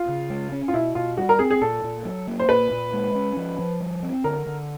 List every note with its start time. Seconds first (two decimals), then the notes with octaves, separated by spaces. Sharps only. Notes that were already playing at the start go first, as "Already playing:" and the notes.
Already playing: F4
0.08 C#3
0.30 G#3
0.52 C#4
0.68 F4
0.74 B2 E4
0.95 B2 F4
1.17 G3 F#4
1.29 A#4
1.39 C4 G#4
1.51 G#4
1.62 A#2 A4
1.84 A#2
2.05 F#3
2.27 A#3
2.40 C5
2.49 A#2 B4
2.71 A#2
2.93 G#3
3.15 C#4
3.37 F3
3.59 F3
3.80 G3
4.02 C4
4.24 D3 A#4
4.47 D3